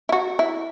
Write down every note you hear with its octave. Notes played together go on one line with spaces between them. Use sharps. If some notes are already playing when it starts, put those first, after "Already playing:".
E4
F#4
E4